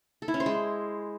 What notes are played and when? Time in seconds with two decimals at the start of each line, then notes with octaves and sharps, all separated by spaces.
0.22 A4
0.28 E4
0.34 C#4
0.40 C5
0.46 G#3